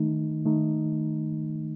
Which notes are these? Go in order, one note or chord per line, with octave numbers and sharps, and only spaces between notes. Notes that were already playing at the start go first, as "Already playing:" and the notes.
Already playing: D#3 A3 D#4
D#3 A3 D#4